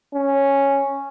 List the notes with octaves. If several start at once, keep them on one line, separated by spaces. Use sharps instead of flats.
C#4